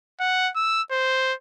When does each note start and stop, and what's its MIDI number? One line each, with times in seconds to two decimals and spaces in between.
0.20 0.49 78
0.56 0.82 88
0.91 1.33 72